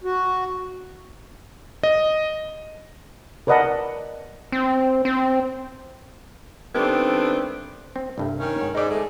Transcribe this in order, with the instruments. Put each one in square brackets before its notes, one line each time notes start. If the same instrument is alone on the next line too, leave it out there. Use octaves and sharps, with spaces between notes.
[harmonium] F#4
[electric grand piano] D#5
[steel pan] A#4 B4 D5 D#5 F#5 A5
[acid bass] C4
C4
[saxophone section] D#3 G3 A3 B3 C4 D4
[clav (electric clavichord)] C4
C2 G2 A3
[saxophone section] D#3 C#4
[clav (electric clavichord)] G#2
[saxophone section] G#2 [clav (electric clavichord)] D#4 D5
[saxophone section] G#3 A3